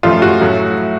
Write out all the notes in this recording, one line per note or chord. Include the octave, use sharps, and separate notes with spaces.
F#2 F3 A3 F4
F#4
A2 F#3 A3